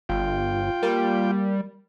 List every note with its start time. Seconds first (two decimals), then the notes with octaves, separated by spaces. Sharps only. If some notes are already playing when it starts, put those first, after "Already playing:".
0.09 G1 F4 G5
0.83 G3 A#3